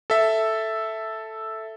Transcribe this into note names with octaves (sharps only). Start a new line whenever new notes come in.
A4 E5